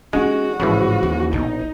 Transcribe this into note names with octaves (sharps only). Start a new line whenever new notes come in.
G#3 C#4 D#4 F#4
A1 G#2 C#3 E3 F3
D#2
A#1 B2 D#4